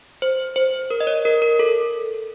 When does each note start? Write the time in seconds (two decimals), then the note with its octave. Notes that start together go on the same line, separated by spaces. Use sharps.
0.22 C5
0.56 C5
0.91 A#4
1.00 D#5
1.07 C#5
1.25 A#4
1.42 A#4
1.59 A4